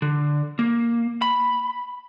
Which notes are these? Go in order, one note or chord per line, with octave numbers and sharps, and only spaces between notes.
D3
A#3
B5